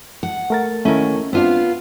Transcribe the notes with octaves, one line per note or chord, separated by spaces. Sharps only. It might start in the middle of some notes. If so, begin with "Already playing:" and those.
F#5
A3 A#4 A6
D#2 A3 C#4 E4 A#4
B3 C4 D4 F4 F5